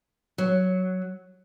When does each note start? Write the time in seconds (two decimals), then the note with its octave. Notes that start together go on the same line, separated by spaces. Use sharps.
0.38 F#3